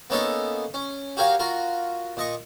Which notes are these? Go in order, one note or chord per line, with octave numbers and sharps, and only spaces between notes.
A#3 B3 C#4 D#4 A4
C#4
F#4 G4 A#4 C#5 F5
F4 F#4 A#4
A#2 D#5 C#6